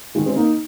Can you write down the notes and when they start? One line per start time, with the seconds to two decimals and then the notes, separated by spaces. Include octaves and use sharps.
0.15 D#3 G#3
0.26 G#3 C4
0.36 A#3 D#4